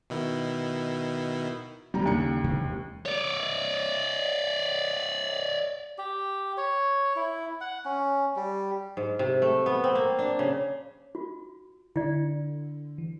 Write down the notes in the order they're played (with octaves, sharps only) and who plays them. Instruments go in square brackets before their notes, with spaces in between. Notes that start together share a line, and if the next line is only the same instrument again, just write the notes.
[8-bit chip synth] B2 D#3 E4
[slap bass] A#2 E3 B3 [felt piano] G3 A#5
[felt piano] D#2 C#7 [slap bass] C#3 D4
[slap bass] C3 E3 G#3
[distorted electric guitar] C#5 D5
[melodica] G4
C#5
E4
F#5
C#4
G3
[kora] G#2
C3
A3
B3
C4
A#3
D4
C#3
[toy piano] F4 F#4
[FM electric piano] D3 [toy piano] E4 D5
[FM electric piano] E3